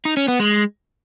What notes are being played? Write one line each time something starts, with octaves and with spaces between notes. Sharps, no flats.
D#4
C#4
B3
G#3